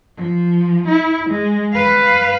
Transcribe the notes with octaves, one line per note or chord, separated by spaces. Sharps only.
F3
E4
G#3
B4 F5